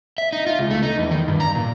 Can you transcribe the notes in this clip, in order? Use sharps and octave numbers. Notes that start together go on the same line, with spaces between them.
E5
D#4
F4
C#2
A3
D#4
E2
D#3
G2
A#5
A#2